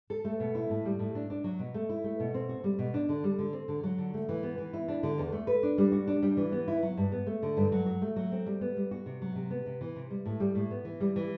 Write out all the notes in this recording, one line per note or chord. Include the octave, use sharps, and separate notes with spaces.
A4
A3
B2
E4
A2
G3
A2
D4
D4
F#3
B2
A3
E4
A3
B2
C4
F#4
G3
B2
D4
D3
G3
D3
C4
D3
F#3
D3
A3
E3
B3
E3
E4
D4
D3
E2
A3
B4
D4
G3
F#4
D4
G3
E3
B3
E4
F#3
G2
B3
A3
D3
G2
F#3
F#4
A3
F#3
C4
G3
B3
G3
F#4
C3
F#3
C3
B3
C3
E3
C3
G3
A2
G3
A2
B3
E3
G3
E3